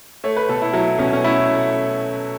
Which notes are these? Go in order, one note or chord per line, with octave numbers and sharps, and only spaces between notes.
A3 C#5
B4
B2 A4
E4
F#3 E4
B2 C#4
C#4
A3 E4